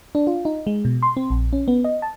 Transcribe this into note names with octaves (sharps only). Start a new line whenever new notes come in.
D4
F4
D#4
G#3
B2
C6
C4
A#1
C#4
B3
D#5
A5